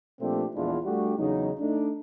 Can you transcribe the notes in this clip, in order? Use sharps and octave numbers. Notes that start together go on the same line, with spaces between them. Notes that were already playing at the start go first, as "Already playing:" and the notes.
A#2 F3 A3 C4 D4 G4
A#1 E2 G#3 D4 E4 F4
G3 A3 D4 F#4 G4
E2 C#3 F#3 D#4
A3 D4 D#4